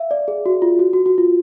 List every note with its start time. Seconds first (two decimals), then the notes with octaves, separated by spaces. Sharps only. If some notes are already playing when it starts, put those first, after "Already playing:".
Already playing: E5 F5
0.11 D5
0.28 G#4
0.46 F#4
0.62 F4
0.79 F#4
0.93 F#4
1.06 F#4
1.18 F4